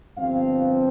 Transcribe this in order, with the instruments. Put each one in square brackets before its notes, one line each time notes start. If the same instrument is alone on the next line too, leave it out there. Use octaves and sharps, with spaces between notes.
[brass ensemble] G1 G2 F3 C4 F5